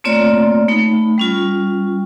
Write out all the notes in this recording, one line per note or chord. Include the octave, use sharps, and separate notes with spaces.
A3 A#3 C4 F4 C#5 D5
A3 D#4 B5
G3 C#4 F4